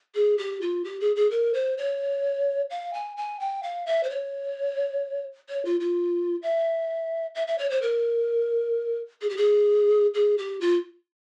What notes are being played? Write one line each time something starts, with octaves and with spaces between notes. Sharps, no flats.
G#4
G4
F4
G4
G#4
G#4
A#4
C5
C#5
F5
G#5
G#5
G5
F5
E5
C5
C#5
C#5
F4
F4
E5
E5
E5
C#5
C5
A#4
G#4
G4
G#4
G#4
G4
F4